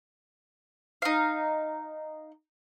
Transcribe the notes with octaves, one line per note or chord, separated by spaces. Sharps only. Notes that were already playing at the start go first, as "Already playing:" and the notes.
D#4 F5